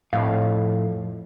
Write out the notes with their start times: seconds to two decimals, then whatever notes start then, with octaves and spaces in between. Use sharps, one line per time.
0.13 F2 A2 F5